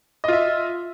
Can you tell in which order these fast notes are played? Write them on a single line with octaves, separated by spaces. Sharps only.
D#5 F4 E5